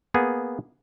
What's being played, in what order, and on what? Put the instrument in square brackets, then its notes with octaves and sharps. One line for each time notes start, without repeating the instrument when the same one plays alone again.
[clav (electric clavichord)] A#3 B3 G#4